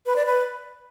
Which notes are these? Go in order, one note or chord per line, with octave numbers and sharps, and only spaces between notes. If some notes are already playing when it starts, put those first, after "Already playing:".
B4
D5
B4